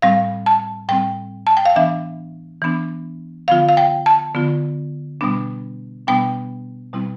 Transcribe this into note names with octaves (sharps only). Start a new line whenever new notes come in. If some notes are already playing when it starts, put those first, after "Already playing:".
A2 G3 C4 F5
A5
A2 G3 C4 G5
A5
G5
F5
E3 B3 D4 E5
E3 B3 D4
D3 F3 B3 F4 F5
F5
G5
A5
D3 F3 B3 F4
B2 G3 B3 D4
B2 G3 B3 D4 G5
B2 G3 C4 E4